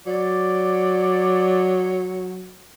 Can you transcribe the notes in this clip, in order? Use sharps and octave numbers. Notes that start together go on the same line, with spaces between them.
F#3 D5